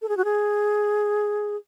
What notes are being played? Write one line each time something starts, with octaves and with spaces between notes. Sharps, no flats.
A4
G#4
F#4
G#4